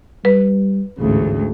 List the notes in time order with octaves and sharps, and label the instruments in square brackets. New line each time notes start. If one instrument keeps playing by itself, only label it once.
[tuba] G3 [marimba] B4
[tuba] A1 [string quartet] D2 G#2 C#3